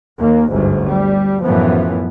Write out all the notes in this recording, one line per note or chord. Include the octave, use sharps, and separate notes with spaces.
D#2 A#3
G1 D2 G#2
G3
F#2 A2 E3 F3 B3